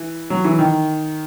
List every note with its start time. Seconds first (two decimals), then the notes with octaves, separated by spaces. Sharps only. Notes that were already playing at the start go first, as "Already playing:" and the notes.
Already playing: E3
0.30 F#3
0.44 E3
0.59 D#3